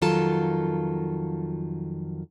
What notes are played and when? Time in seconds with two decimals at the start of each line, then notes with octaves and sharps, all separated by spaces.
0.02 F2 D#3 F#3 F4 A4 A5